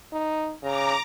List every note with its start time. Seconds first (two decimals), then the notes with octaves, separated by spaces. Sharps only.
0.13 D#4
0.63 C#3 A#5 D6